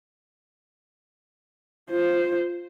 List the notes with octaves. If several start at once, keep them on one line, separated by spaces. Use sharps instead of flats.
F4 C5